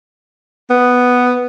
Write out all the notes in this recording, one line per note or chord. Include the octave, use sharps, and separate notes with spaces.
B3